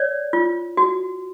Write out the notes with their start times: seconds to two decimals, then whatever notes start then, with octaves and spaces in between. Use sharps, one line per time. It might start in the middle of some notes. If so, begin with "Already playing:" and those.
Already playing: C#5 D5
0.33 F4
0.77 F#4